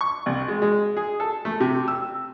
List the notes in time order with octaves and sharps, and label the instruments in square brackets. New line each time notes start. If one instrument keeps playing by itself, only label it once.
[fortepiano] C#6
C2
G#3
G#3
G#4
A4
A3
C3
E6